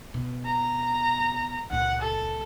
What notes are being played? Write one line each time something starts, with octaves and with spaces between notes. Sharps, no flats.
B2
A#5
C#2 A#2 F#5
A4